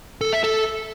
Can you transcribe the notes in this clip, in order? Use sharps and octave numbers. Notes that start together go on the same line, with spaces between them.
A4
E5
A4